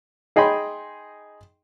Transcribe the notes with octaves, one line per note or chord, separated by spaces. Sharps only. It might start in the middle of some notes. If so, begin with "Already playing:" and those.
D#4 G#4 D#5 G5 B5 C6